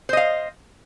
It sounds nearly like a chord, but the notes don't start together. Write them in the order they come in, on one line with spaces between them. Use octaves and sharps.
C5 D#5 F5